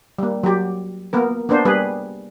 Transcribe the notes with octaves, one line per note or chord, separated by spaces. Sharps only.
G3 A#3
F#3 G4
A#3 B3 A#4
A#3 B3 D4 C5
G3 G#4 B4